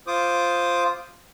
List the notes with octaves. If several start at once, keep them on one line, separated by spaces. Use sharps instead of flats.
F4 C5 D6 D#6